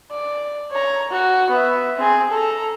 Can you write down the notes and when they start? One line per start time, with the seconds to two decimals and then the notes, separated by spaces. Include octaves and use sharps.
0.11 D5
0.72 C#5 A#5
1.10 F#4
1.50 B3 E5
1.97 C4 G#4
2.31 A4 A#5